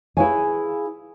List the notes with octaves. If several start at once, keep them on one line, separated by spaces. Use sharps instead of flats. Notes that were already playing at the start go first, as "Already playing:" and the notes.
E4 G#4 B4 C#5 F5 G#5